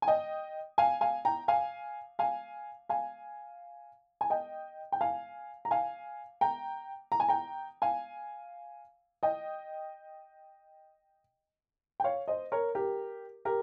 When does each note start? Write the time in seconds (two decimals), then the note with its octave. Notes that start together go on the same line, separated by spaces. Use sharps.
0.02 G#5
0.08 D#5 G5
0.78 F5 G#5
1.01 F5 G#5
1.25 G5 A#5
1.48 F5 G#5
2.19 F5 G#5
2.89 F5 G#5
4.21 G#5
4.30 D#5 G5
4.92 G5
5.01 F5 G#5
5.65 A#5
5.71 F5 G#5
6.41 G5 A#5
7.12 A#5
7.20 G#5
7.28 G5 A#5
7.82 F5 G#5
9.23 D#5 G5
12.00 G5
12.04 C#5 F5
12.28 C5 D#5
12.52 A#4 C#5
12.75 G4 A#4
13.45 G4 A#4